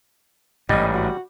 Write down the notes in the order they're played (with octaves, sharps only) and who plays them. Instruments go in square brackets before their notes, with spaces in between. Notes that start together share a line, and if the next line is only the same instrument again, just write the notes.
[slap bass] A1 G#2 [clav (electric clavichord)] G3 [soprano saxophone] D#5
[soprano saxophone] F#4